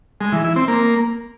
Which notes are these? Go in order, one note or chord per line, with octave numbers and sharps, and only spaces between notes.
G#3
E3
E4
C4
A#3